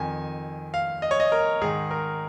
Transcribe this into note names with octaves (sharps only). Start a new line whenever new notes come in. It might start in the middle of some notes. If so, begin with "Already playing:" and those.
Already playing: F2 D#3 G#5
F5
D#5
C#5
D#5
A#4
G#2 D#3 G#4
A#4